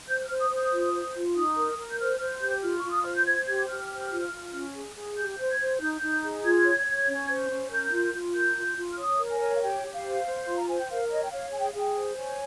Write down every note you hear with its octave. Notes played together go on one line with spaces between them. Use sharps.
C5 G6
G6
F6
C5
D#6
C5
D#6
F4
C5
F4
D#4 D#6
A#4
A#4
G6
C5 F6
C5 F6
G4 G6
F4 F6
F4 C#6
D#6
C5 F6
G6
C5 G#6
G4 G#6
G4 F6
C5
F4
F4
C#4
G#4
G#4
G4 G6
C5
G#6
C5
D#4 G6
D#4
G#4
F4 G#6
C#5
C#5
C#4
C5
C#4
A#4 G6
F4
F4
A#4 G6
F4
F4
F6
C#5 D#6
A#4
G#5
C#5
F5
G4 G5
G4
F5
C5
C5
F4 C6
A#5
C5 G#5
G5
A#4 F5
C#5 D#5
G5
C#5 F5
G#4 G#5
G5
F5
G#4 G5
C5
C#5 G#5